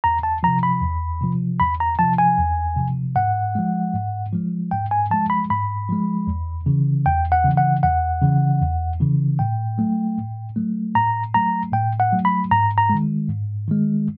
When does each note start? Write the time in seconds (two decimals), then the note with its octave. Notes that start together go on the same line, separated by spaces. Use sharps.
0.04 E2 A#5
0.23 A5
0.43 C3 F3 A#5
0.63 B5
0.82 E2
1.21 C3 F3
1.60 E2 B5
1.80 A#5
1.99 C3 F3 A5
2.18 G#5
2.38 E2
2.77 C3 F3
3.16 G#2 F#5
3.55 F3 G#3
3.94 G#2
4.33 F3 G#3
4.71 G#2 G5
4.91 G#5
5.11 F3 G#3 A5
5.30 B5
5.50 G#2 B5
5.89 F3 G#3
6.27 E2
6.66 C#3 E3
7.06 E2 G5
7.32 F#5
7.44 C#3 E3
7.57 F#5
7.83 E2 F#5
8.22 C#3 E3
8.62 E2
9.01 C#3 E3
9.39 A2 G5
9.78 F#3 A3
10.18 A2
10.56 F#3 A3
10.95 A2 A#5
11.34 F#3 A3 A#5
11.72 A2 G5
12.00 F#5
12.12 F#3 A3
12.25 B5
12.51 G#2 A#5
12.78 A#5
12.89 G#3
12.94 D#3
13.29 G#2
13.68 D#3 G#3